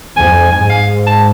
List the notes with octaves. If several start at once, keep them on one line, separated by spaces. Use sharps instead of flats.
F2 G#5
G#2 G#5
F5
A5